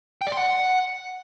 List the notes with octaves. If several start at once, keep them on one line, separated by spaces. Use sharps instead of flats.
G5
D5
C6
F#5